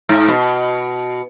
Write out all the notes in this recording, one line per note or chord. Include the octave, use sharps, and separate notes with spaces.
G#2
B2